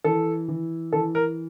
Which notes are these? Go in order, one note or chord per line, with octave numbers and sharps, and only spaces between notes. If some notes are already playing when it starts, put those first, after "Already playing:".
E3 A4
E3
E3 A4
A#4